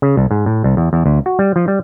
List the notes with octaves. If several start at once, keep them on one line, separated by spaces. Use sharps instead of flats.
C#3
C2
G#2
A2
C2
E2
E2
D2
F#4
G3
F3
G3